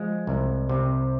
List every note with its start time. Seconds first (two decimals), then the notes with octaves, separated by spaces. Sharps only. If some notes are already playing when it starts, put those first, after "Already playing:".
Already playing: F3 G#3
0.27 C2
0.69 C3